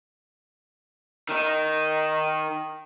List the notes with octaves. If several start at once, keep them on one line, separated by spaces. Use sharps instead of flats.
D#3 D#4